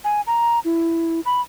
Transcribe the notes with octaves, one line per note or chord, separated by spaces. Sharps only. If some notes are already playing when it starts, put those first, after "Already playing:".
G#5
A#5
E4
B5